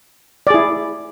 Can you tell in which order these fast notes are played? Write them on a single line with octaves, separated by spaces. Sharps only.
D5 G#4 E4